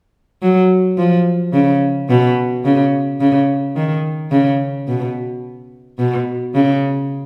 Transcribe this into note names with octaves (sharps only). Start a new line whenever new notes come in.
F#3
F3
C#3
B2
C#3
C#3
D#3
C#3
B2
B2
C#3